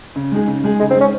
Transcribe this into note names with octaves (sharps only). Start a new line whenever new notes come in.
C#3
G#3 D#4 G#4
C#3
G#3 D#4 G#4
C#3 G#3
C4
G#3 D#4 G#4
C#4